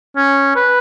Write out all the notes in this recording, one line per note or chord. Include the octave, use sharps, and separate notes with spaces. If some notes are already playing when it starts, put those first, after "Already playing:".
C#4
B4